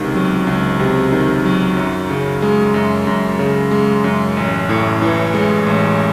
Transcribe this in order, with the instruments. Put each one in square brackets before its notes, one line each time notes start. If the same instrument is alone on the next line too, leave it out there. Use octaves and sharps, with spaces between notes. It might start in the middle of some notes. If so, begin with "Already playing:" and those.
Already playing: [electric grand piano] C#2 C3 D#3
F#3
C#2
C3
D#3
F#3
F#2
C#3
G#3
F#2
F#2
C#3
G#3
F#2
A1
A2
E3
G#3
A1